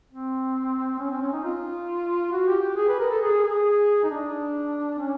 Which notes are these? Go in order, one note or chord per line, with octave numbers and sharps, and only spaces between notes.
C4
C#4
C4
C#4
D#4
F4
F#4
G4
G4
G#4
B4
A#4
A4
G#4
G#4
D#4
D4
C#4